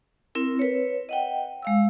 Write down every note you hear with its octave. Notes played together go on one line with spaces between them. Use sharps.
C4 E4 A#4
B4 C#5
D#5 F#5 G5
G#3 F5 E6